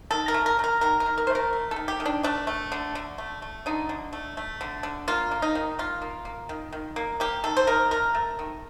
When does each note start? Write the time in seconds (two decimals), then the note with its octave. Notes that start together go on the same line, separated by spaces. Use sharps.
0.11 D#3 A4
0.28 A#4
0.34 A3
0.46 A#4
0.59 A3
0.64 A#4
0.81 D#3 A#4
1.00 A#4
1.06 D#3
1.18 A#4
1.27 C5
1.30 A3
1.35 A#4
1.53 A3
1.71 A4
1.76 D#3
1.88 G4
2.00 D#3
2.05 D4
2.23 A3 D4
2.47 A3
2.72 D3
2.95 D3
3.18 A3
3.42 A3
3.66 D3 D#4
3.89 D3
4.13 A3
4.37 A3
4.61 D3
4.83 D3
5.08 A#3 F4
5.31 A#3
5.42 D#4
5.55 D#3
5.79 D#3 F4
6.02 A#3
6.25 A#3
6.49 D#3
6.73 D#3
6.96 A#3
7.20 A#3 G4
7.44 D#3 A4
7.57 C5
7.67 D#3 A#4
7.91 A3 A#4
8.15 A3
8.39 D#3